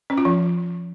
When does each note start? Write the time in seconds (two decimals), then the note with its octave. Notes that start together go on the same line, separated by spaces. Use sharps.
0.10 C#4
0.18 F4
0.25 F3